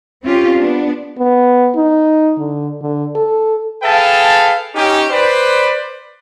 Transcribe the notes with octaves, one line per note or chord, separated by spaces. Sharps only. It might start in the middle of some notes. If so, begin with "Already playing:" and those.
C4 C#4 F4 G4
B3 D4
B3
D#4
D3
D3
A4
G#4 A4 B4 F5 G5 A5
C#4 D#4 G4
B4 C5 D5